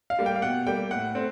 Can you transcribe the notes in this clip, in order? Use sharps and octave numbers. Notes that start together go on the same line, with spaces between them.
F5
G3 A#3
G5
F5
B2 F#5
G3 A#3 G5
A2 F#5
A3 C4